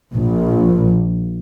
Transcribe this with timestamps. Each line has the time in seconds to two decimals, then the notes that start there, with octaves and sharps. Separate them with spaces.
0.13 A#1